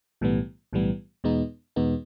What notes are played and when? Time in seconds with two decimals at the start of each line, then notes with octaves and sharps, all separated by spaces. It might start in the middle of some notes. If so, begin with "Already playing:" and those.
0.21 B1 A2 E3 G3 B3
0.73 B1 A2 E3 G3 B3
1.24 E2 B2 G#3 B3 D#4
1.76 E2 B2 G#3 B3 D#4